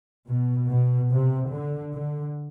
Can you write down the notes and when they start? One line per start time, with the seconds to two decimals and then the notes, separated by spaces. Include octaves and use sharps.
0.26 B2
0.68 B2
1.10 C3
1.51 D3
1.93 D3